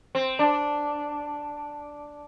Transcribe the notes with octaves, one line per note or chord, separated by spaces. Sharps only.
C4
D4